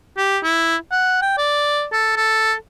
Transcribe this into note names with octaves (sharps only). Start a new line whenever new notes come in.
G4
E4
F#5
G5
D5
A4
A4